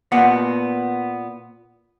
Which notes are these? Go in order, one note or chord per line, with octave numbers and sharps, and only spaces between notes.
A#2 B3 F#5